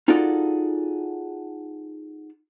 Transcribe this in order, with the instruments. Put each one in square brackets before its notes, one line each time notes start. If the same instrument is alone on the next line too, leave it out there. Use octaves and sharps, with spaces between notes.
[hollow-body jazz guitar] D#4 F4 F#4 G#4 A4 D5